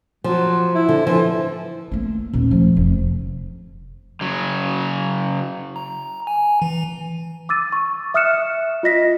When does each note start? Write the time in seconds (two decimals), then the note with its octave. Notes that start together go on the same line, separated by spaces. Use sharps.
0.24 F3 F#3
0.75 E4
0.89 D3
1.07 E3 F3
1.92 A3 A#3
2.33 D#1
2.51 F3 A3
2.77 F1
4.21 C#3 F#3
5.76 A#5
6.27 G#5
6.62 E3
7.49 D6 E6 A6 D#7
7.72 C#6
8.14 E5 D#6 F6 F#6 C#7 E7
8.83 F4 D#5 A#6 B6